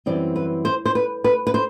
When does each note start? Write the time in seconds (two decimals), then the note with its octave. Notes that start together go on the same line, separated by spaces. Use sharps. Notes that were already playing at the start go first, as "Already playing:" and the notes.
0.06 F#2 E3 G3 C4 D5
0.36 B4
0.65 C5
0.86 C5
0.95 B4
1.24 B4
1.47 B4
1.54 C5